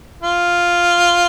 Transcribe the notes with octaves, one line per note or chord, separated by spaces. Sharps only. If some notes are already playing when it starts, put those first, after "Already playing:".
F4